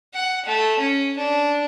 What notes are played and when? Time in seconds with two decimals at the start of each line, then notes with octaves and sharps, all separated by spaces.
0.14 F#5
0.46 A3
0.79 C#4
1.17 D4